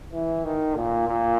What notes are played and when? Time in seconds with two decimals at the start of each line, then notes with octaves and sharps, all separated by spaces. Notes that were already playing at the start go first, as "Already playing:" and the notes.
0.12 E3
0.44 D#3
0.76 A#2
1.07 A#2